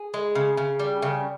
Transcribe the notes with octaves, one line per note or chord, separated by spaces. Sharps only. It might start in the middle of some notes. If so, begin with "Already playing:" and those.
Already playing: G#4
G#3
C#3
C#3
G3
C#3